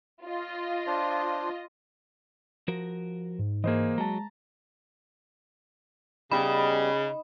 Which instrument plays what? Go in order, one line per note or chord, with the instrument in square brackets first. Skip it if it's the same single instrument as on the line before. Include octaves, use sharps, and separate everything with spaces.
[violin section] F4 D#5
[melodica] D4 C5
[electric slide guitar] F3 F#4 A#4
[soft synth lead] G#2
[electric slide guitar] E3 G#4 [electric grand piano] A#3 C5 D#5
[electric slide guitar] F#3 [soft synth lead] G#3 [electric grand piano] A5 A#5
[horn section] C#3 [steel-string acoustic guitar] G3 B3 G4 [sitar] D#4 [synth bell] B5